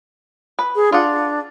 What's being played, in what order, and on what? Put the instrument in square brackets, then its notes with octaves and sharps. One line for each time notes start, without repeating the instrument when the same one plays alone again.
[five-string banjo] B4
[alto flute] G#4
[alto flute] D4 [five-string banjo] F4 F#5